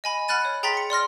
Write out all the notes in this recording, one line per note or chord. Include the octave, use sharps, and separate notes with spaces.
D#5 G#5 B5
F#5 B5 F6 F#6 A6 D#7
C#5
G#4 G5 A#5 C6 A6 B6
C#7
D5 C6 F6 A#6